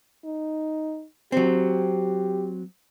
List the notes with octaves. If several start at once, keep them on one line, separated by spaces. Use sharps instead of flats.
D#4
F#3 C4 G4